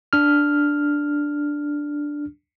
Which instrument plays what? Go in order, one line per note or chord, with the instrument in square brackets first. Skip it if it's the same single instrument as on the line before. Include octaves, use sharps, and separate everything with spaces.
[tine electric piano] D4 F6